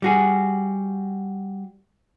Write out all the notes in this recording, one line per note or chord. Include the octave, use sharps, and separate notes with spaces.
G3 F#4 G#4